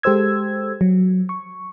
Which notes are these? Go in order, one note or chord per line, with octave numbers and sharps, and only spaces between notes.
G#3 G4 A4 C5 E6 G#6
F#3
C#6